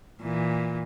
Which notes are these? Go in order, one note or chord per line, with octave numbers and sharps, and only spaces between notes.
A#2 E3